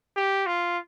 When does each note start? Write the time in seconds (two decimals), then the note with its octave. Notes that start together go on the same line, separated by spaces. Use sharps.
0.17 G4
0.46 F4